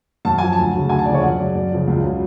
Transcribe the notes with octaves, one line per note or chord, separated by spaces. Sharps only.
F#2 A5
F3 G#5
A5
D2
C#3 F#3
D2 G#5
A5
C#3 F3 D5
C#5
F#2 F#5
C#3 F#3 D5
F#2 D5
C#3 F3
C#2
C#3 F#3